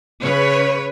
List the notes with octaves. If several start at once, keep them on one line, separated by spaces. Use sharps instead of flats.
C#3 B4 C#5